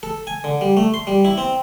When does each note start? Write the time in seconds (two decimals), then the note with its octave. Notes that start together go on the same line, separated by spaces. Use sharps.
0.03 A4
0.27 G#5
0.44 D3
0.61 G3
0.77 A3
0.94 C6
1.07 G3
1.25 E4
1.38 C4